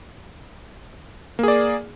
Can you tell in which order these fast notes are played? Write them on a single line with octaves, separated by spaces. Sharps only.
A#3 G#4 D5